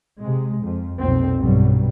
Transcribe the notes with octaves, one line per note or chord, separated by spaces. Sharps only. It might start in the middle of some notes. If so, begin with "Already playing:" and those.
C3 G#3
F2
B1 F2 A#2 C4
B1 G2 B2 F#3 G3